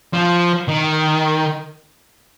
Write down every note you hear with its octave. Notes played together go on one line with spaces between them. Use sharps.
F3
D#3